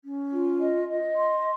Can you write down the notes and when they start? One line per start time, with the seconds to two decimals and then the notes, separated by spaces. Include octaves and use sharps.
0.04 C#4
0.32 F4
0.59 D#5
0.87 D#5
1.15 C6